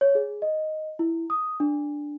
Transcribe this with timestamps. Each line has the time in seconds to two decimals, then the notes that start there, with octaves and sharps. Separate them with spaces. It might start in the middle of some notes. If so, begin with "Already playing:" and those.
0.01 C#5
0.15 G#4
0.42 D#5
0.99 E4
1.30 D#6
1.60 D4